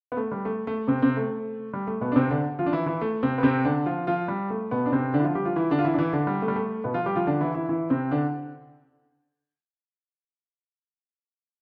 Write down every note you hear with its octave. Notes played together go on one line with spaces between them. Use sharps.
B3
A3
G3
A3
A3
C3 C4
C3 C4
A3
G3
A3
B2 B3
D4
C3 C4
D3 D4
F3 F4
D4
E3 E4
E3 E4
A3
C3 C4
B3
C3 C4
D3 D4
F3 F4
F3 F4
G3
A3
B2 B3
D4
C3 C4
D3 D4
E4
F3 F4
G3 G4
F3 F4
E3 E4
D3 D4
F4
E3 E4
D4
E3 E4
D3 D4
G3
A3
G3
A3
B2 B3
F3 F4
G3 G4
F3 F4
D3 D4
E3 E4
E3 E4
E3 E4
C3 C4
D3 D4